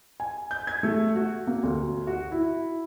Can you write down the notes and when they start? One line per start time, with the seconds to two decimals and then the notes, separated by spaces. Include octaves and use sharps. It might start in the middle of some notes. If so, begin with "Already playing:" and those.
0.20 G#5
0.51 G6
0.67 G#6
0.83 A3
1.15 F#4
1.47 A#3
1.63 D2
2.07 F#4
2.32 E4